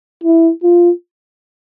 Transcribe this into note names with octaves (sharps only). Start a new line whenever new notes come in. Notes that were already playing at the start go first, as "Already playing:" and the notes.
E4
F4